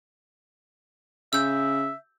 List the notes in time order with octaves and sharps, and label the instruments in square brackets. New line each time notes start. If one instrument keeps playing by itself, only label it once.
[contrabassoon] C#3 [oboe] E5 [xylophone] E6 G6